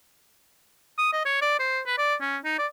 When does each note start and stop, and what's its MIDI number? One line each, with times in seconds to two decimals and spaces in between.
0.98 1.11 87
1.13 1.25 75
1.25 1.39 73
1.42 1.59 74
1.59 1.81 72
1.86 1.96 71
1.98 2.15 74
2.21 2.37 61
2.44 2.58 63
2.58 2.67 74